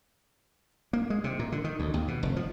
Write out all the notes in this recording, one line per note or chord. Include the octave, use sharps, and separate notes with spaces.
A#3
G#3
C3
A#2
D3
D#3
D2
D#2
B2
F1
F3